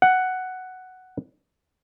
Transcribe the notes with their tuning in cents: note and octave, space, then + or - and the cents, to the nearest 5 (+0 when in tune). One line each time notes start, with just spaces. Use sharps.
F#5 +5